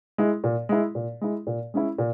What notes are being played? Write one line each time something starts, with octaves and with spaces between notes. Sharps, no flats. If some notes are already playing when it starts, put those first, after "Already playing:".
G#3 E4
A#2
G#3 E4
A#2
G#3 E4
A#2
G#3 C#4 E4
A#2